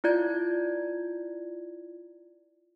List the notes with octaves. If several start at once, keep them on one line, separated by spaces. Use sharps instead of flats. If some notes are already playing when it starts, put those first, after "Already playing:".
E4 F4 D5 G#6